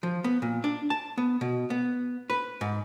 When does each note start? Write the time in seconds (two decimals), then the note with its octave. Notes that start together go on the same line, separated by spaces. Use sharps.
0.03 F3
0.24 B3
0.42 A#2
0.64 D4
0.90 A5
1.18 B3
1.41 B2
1.70 B3
2.30 B4
2.61 G#2